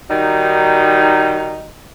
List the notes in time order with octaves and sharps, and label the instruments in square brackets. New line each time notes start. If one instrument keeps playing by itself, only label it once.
[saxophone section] D#3 G3 D#4 F#4